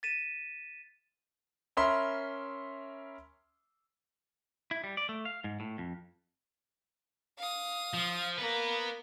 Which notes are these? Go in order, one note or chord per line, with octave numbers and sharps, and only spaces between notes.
A6 B6 D#7 E7
C#4 A#4 E5 B5 C6
E4
G3
D5
A3
F5
G#2
A2
F2
F5 D#6
F3
A#3 B3 B4